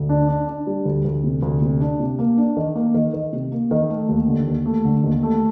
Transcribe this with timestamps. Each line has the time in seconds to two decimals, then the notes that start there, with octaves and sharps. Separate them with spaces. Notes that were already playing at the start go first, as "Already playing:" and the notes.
Already playing: D2
0.09 D4
0.28 D4
0.48 D4
0.66 G3
0.85 D2
1.05 D2
1.24 C3
1.42 D2
1.62 C3
1.81 D4
2.00 C3
2.19 A#3
2.37 D4
2.57 D#3
2.75 A#3
2.94 D#3
3.14 D#3
3.33 C3
3.52 A#3
3.71 D#3
3.90 A3
4.09 D#2
4.28 D3
4.47 D#2
4.66 A3
4.85 D3
5.04 D#2
5.23 A3